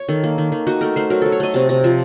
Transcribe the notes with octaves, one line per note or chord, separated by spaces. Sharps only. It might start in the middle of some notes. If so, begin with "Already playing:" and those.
Already playing: C#5
D#3 A4
A#3
D#3
D#3
D#4 F#4
A3 A#4
A3 C5
F#3 A#4
F#3 A4
C#5
A3 D#5
C3 A5
C3 A#5
F3 A5